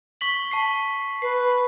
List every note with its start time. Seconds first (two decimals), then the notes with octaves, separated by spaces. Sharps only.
0.21 C#6 B6 F#7
0.51 A5 C#6 C7
1.22 B4 C7